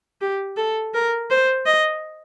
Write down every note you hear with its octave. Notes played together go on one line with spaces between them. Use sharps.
G4
A4
A#4
C5
D#5